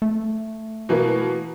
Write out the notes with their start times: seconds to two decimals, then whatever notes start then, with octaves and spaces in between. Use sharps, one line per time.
0.02 A3
0.89 B2 E3 A#3